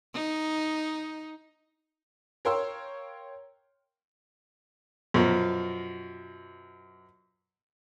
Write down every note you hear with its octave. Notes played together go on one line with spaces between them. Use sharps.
D#4
A#4 C#5 F5 G5 C6 E6
F#2 B2 F3